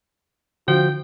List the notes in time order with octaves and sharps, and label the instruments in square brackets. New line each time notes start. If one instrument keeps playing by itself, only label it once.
[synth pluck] D3 [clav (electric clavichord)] F3 [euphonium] F#4 [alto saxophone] G5